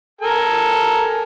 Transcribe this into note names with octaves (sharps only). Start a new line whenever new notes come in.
A4 A#4 G#5